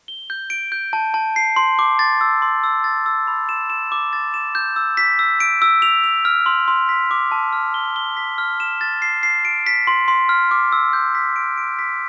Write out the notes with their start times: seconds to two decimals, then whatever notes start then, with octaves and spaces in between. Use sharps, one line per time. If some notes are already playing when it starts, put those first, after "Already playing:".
0.08 G7
0.30 G6
0.50 D7
0.72 G6
0.93 A5
1.14 A5
1.36 C7
1.56 C6
1.79 D6
1.99 A6
2.21 E6
2.42 C6
2.64 E6
2.84 A6
3.06 E6
3.27 B5
3.49 E7
3.70 E7
3.92 D6
4.13 A6
4.34 E7
4.55 G6
4.76 E6
4.97 B6
5.19 E6
5.40 D7
5.62 E6
5.82 F7
6.04 F7
6.25 F6
6.46 C6
6.68 C6
6.89 B6
7.11 D6
7.32 A5
7.53 F6
7.74 G7
7.96 G7
8.17 B6
8.38 F6
8.60 E7
8.81 A6
9.02 C7
9.23 C7
9.45 D7
9.66 B6
9.87 C6
10.08 C6
10.29 F6
10.51 D6
10.72 E6
10.93 G6
11.15 B6
11.36 D7
11.57 D7
11.79 B6